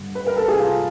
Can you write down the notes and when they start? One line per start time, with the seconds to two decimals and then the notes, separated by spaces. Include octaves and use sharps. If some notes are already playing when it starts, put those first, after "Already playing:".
Already playing: G2 D3
0.15 B4
0.27 A#4
0.37 A4
0.48 G#4
0.59 F4